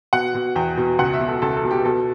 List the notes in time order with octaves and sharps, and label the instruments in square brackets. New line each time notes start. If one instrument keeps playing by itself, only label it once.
[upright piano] B2 F#5
B2
E2 G5
B2
C#2 F#5
E5
B2
A4
C#2 A4
A4
B2
G4
B2 A4